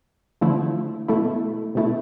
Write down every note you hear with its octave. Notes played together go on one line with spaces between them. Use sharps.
D3 F3 A3 E4
B2 A3 E4
B2 A3 E4